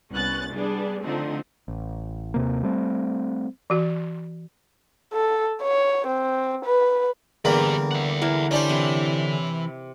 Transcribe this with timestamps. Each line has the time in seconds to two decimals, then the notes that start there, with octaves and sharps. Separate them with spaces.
0.12 C2 B3 C#4 F#6 A6
0.54 G3 B3 D4 G#4
1.03 D3 F3 A3 C4 D#4
1.68 A1
2.34 D#2 C3 A#3
2.63 G3 A3 C4
3.70 E3 F#4
5.13 A4
5.62 C#5
6.07 C4
6.65 B4
7.45 E2 D3 G3 A#3 G4 A#4 B4
7.91 E5 F#5
8.22 E3 A#4
8.51 G3 C#4 D4 G4 C5
8.69 C3 E3